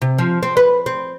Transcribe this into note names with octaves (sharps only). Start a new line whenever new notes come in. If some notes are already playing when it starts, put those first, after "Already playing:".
C3
F3
C4
B4
C4